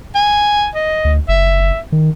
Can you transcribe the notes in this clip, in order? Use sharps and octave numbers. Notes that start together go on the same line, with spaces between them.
G#5
D#5
D2
F#1 E5
D#3